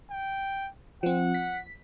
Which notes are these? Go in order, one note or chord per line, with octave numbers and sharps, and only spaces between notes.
G5
F3 C4 F#5
B6